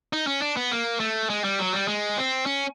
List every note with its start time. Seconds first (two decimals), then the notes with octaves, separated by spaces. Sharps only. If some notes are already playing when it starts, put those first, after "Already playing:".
0.13 D#4
0.27 C#4
0.42 D4
0.57 B3
0.72 A#3
1.00 A3
1.30 G#3
1.44 G3
1.59 F#3
1.73 G3
1.88 G#3
2.17 C4
2.46 C#4